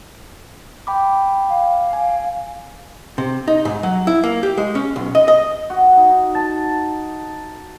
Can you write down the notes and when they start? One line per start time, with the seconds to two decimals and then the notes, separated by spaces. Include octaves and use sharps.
0.87 G5 B5 D6
1.50 F5
1.93 G#5
3.18 C3
3.48 D#4
3.65 G#2
3.83 F#3
4.07 E4
4.23 A#3
4.43 G4
4.58 G#3
4.75 C#4
4.96 B1
5.15 D#5
5.28 D#5
5.70 F#4
5.97 D#4
6.35 A5